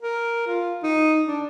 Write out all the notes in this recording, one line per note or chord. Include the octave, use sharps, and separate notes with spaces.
A#4
F4
D#4
D4